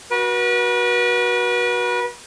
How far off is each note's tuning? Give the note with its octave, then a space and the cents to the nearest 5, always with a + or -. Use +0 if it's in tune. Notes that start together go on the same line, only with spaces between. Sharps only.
F#4 +0 B4 -35